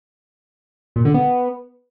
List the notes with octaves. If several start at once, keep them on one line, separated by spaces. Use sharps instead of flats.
A#2
D3
B3